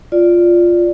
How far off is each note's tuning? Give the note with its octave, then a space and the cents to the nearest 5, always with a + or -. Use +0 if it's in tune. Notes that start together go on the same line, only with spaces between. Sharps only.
F4 +0 D5 +0